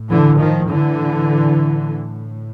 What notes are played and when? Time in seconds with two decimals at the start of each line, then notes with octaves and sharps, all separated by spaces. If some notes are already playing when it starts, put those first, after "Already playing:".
Already playing: A2
0.10 D3 E3
0.39 D#3 F3
0.68 D3 E3
1.57 A2